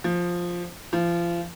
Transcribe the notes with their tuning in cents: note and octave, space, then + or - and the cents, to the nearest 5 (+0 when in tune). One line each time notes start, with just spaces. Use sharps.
F3 +5
F3 -30